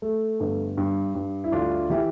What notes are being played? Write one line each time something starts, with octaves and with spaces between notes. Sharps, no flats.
A3
G1
G2
G2
E4
D2 D4 F4
E3 E4 G4